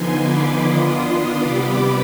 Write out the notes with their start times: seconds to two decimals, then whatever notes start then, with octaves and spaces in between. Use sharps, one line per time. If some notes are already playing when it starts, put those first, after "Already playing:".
Already playing: D3 F3 B3 D#4 G#5 C6
0.18 B5 D6
0.58 D#3 B3 D4 F4 C6 D#6
1.39 C3 G3 B3 B5 D6